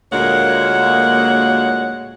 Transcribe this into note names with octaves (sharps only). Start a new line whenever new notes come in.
D2 A#2 G#3 A#3 C#5 F#5